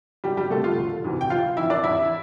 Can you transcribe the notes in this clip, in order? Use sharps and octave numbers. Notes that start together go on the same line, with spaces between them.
G1 G3 G4
G3 G4
G2 D3 A3 A4
F4 F5
E1
D2 C3 E3
G5
G1 F4 F5
F2 E3 E4 E5
D4 D5
E2 E4 E5